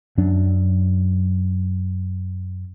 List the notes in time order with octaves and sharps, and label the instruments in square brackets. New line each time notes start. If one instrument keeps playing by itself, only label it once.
[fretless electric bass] F#2 F#3 D4